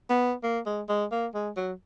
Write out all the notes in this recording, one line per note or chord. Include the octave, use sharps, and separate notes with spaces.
B3
A#3
G#3
G#3
A#3
G#3
F#3